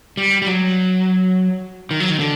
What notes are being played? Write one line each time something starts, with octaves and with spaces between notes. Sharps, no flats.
G3
G3
F#3
D#3
F#3
D#3
D3